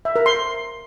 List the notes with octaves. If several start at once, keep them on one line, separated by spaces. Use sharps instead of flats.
E5
A#4
C6